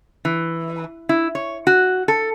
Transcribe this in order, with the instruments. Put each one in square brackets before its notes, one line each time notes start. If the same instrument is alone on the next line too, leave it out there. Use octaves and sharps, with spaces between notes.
[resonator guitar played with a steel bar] E3
E4
C#5
F#4
A4